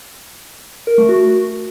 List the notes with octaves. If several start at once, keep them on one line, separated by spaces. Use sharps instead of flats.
A#4
A3
F#4